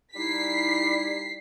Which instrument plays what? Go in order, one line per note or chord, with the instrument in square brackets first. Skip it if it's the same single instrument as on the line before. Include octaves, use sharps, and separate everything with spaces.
[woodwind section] G3 D#4 E4 [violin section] B6 C7